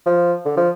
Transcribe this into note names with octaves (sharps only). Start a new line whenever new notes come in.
F3
D3
F3